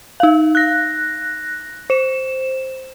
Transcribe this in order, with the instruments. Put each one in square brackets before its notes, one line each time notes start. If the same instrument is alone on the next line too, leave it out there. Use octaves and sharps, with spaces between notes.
[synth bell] D#4 F5
F#6 A#6
C5 E7